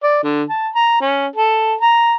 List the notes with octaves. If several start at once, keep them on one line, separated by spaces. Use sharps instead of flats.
D5
D3
A5
A#5
C#4
A4
A#5